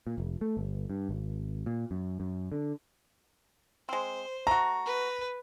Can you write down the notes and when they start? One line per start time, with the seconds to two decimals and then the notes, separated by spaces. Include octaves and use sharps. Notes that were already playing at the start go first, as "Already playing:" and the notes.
0.07 A#2
0.18 F1
0.41 A3
0.57 G1
0.90 G2
1.09 G#1
1.66 A#2
1.91 F#2
2.20 F#2
2.52 D3
3.89 G#3 C4 C5
4.47 A3 F#4 A#5
4.85 B4